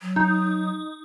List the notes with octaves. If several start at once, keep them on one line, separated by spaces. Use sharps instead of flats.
F#3
D#4